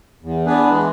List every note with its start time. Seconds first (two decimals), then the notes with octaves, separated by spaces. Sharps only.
0.23 E2
0.47 B3 D4 G#4 B4
0.69 E3 G#3